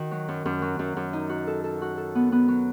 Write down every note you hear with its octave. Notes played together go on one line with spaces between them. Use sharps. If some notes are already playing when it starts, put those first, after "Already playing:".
Already playing: D#3 F#4
F#3
F#2
F#2
F#3
F#2
F#2
D#4
F#4
A4
A4
F#4
A4
B3
B3
F#3